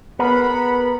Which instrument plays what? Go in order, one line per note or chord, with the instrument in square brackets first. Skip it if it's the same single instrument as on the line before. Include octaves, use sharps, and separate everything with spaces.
[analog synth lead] B3 [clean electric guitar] G#4 A#4 [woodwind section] F#5 B5